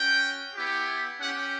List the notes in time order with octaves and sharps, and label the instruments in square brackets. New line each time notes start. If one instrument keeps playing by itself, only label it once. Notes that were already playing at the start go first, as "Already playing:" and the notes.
Already playing: [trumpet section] C#4 F#4 G5
B3 E4 G4
C#4 G4 F#5